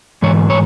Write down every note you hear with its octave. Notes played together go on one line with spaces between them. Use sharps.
G#2 E3 C#5
C#5